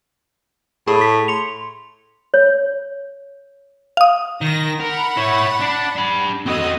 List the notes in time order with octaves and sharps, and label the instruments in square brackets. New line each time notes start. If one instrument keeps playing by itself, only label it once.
[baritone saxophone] A2 [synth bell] G#4
[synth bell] B6
C6 C#7 F7
[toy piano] C#5
[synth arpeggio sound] F5 D#6
[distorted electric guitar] D#3 [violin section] A#6
[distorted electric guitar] A#4 [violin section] F#5 B5
[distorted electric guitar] E4 C#5
D4
D4 B5
[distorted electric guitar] C4 A4 [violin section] F#4 D#5